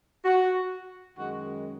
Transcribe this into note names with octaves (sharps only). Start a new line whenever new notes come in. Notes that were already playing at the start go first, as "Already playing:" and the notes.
F#4
F#2 D#3 G#3 F#4